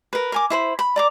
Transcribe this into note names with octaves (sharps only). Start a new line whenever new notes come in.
A#4 B4
A#4 G#5 D6
E4 C5 B5
B5
D5 A#5 D6